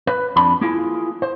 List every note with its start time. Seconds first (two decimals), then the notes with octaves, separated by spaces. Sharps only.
0.07 B4
0.36 F2 D4 B5
0.61 A#3 E4 F4 G#4
1.22 C5